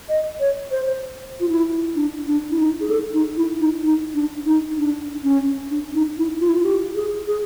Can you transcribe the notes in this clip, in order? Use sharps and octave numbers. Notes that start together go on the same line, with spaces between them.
D#5
C#5
C5
F4
E4
D4
D4
E4
D#4
G#4
A4
D#4
E4
D#4
D#4
D4
D#4
D4
C#4
D4
D#4
E4
F4
E4
F4
G4
G#4
G#4